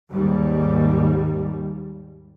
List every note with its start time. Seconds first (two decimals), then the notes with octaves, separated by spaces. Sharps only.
0.13 D#2 G#2 G3